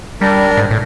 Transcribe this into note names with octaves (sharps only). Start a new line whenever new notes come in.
G3 D4 A#4
G#2
A2